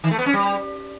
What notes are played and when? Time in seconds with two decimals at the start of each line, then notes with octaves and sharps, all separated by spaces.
0.04 D#3
0.11 A3
0.19 B3
0.26 C#4
0.33 G3